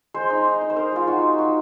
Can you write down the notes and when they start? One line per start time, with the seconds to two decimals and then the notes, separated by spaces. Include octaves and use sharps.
0.14 G#3 C5
0.30 D#4
0.46 D#4
0.61 D#4
0.70 C5
0.76 D#4 A#4
0.92 G#3 F4
1.07 D#4 F#4
1.23 D#4
1.39 D#4 F#4